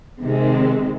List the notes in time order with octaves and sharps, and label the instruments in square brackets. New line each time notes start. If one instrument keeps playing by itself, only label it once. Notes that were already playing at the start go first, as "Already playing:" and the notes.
[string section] C3 D#3 G#3 C4